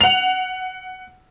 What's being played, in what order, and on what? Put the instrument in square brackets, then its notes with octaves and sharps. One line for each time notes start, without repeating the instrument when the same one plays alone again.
[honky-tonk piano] F#5 F7